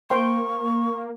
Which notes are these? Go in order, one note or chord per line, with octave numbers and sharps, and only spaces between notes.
A#3 C5 G5 C6 C#6